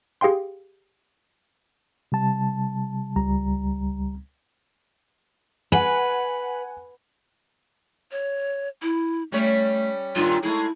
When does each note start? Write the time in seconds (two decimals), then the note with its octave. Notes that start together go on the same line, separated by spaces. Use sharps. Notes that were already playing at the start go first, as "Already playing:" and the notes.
0.21 G4 G#4 F5 G5 C6
2.12 C3 G3 A5
3.16 C#2 G3 A#5
5.72 B4 F#5 G#5
8.11 C#5
8.82 E4
9.32 G3 A3 C#4 C#5
10.16 G2 A#2 D#3 F4
10.43 G#3 A3 E4 G#4